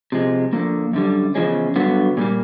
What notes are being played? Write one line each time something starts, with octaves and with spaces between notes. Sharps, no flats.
C3 F3 G#3
D3 F3 A#3
F#2 D3 G3
E2 C#3 F3 G#3 C#4
G2 D3 F#3 B3
A#2 G3 A#3